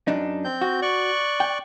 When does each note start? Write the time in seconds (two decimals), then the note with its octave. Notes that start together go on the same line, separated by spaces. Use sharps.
0.08 F#2 D4 D#4
0.45 C4 G6
0.61 F#4
0.82 D5 C#6 F#6
1.40 G5